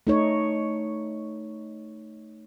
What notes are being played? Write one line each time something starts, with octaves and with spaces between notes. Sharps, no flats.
A3 D#4 C#5